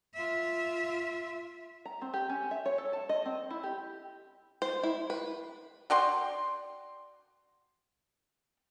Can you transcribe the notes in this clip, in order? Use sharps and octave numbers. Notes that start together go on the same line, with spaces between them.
F4 E5
A#5
C4
G4
C#4
E5
C#5
A4
A5
D#5
C4
E4
G4
C5
E4
B4
F#4 D5 G5 C6